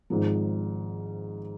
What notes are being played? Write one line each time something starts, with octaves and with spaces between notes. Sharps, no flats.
G#1 G#2 F3